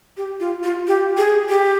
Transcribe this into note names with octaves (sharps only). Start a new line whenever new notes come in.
G4
F4
F4
G4
G#4
G4